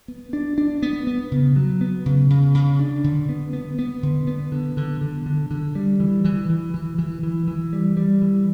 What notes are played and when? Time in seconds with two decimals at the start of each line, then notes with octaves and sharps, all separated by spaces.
0.08 B3
0.33 D4
0.58 D4
0.82 B3
1.07 B3
1.32 C#3
1.56 F#3
1.81 B3
2.06 C#3
2.30 C#3
2.55 C#3
2.79 D4
3.04 D3
3.29 B3
3.53 B3
3.79 B3
4.03 D3
4.27 B3
4.52 D3
4.77 D3
5.01 D3
5.26 D3
5.51 D3
5.75 G3
6.00 E3
6.25 E3
6.50 E3
6.74 E3
6.99 E3
7.23 E3
7.48 E3
7.73 G3
7.97 G3
8.22 E3